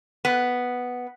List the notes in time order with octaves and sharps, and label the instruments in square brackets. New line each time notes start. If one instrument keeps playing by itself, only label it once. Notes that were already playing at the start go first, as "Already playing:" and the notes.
[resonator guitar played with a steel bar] B3